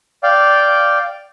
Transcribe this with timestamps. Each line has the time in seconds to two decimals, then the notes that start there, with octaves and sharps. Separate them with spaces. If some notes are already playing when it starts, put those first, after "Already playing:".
0.23 D5 F5 G5